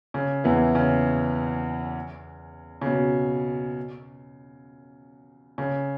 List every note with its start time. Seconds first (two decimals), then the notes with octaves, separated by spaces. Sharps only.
0.14 C#3
0.44 E2 E3
0.75 C#3
2.82 C#3
2.86 B2
5.58 C#3